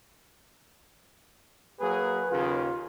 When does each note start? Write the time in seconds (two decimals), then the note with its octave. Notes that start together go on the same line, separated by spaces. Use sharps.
1.80 F#3 A#3 G#4 B4
2.31 D#2 C#3 F4